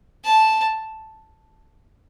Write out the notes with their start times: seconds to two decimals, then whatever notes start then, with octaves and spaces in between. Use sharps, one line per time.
0.24 A5